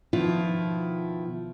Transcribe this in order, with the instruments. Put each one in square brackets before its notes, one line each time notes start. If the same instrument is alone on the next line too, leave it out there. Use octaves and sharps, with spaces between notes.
[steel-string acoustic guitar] B2 D#3 F3 E4 F4